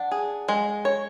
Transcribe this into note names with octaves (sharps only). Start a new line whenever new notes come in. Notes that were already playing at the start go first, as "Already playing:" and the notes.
Already playing: D4 F#5
G#4
G#3
C#5